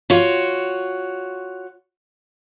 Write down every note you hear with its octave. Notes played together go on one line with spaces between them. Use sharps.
F4 F#4 C#5